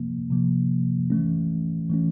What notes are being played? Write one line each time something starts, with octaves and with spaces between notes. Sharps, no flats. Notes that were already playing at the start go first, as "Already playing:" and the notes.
Already playing: C3 F3 A#3
C3 F3 A#3
E3 A3 C#4
E3 A3 C#4